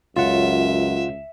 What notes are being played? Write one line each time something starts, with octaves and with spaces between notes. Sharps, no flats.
C#2 F#2 F4 E5 F#5